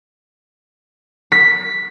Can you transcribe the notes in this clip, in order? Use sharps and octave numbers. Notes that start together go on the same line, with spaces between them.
B6